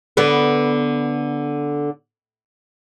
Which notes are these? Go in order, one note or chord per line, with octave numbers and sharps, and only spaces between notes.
D3 B3